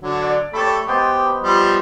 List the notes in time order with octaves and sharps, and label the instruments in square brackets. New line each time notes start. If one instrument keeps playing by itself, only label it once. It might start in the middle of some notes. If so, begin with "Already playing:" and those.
[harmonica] D3 F#3 D4
[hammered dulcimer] D5
[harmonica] A3 G4 A4 [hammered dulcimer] C#5 B5
[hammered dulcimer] G#3 B3 C5 [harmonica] G4
[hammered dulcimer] B5
[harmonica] F3 G3